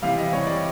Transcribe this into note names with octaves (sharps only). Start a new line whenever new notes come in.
C3 E3 G3 F5
D#5
C3 E3 G3 C#5
D5